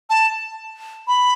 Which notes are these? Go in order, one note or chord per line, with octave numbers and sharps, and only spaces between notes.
A5
B5